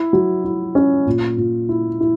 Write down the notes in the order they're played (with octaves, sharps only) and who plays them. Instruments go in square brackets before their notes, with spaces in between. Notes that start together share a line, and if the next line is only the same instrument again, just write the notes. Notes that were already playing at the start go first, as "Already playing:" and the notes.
Already playing: [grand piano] E4
F#3
E4
C#4
A#2
A#2
E4
E4